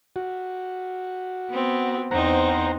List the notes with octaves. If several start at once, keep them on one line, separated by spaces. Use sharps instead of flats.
F#4
B3 C4
E2 C4 D#4 C5 F#5 A#5